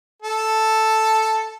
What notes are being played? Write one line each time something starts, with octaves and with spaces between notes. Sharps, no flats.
A4